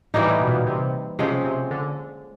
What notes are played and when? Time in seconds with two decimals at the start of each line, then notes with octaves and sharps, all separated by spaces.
0.14 A2 E3 G3 A#3 D#4
0.27 A2
0.41 B2
0.47 A#2
0.54 B2
0.66 C3
1.19 C3 F3 G#3 C#4
1.44 C3
1.71 D3